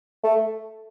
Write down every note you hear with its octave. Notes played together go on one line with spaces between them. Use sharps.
A3